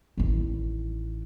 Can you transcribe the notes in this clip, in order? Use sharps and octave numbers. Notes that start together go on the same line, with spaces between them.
A1 D#3